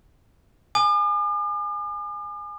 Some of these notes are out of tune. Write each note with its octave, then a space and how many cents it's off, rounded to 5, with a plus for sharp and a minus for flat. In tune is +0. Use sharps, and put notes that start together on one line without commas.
G#5 +0 D6 +45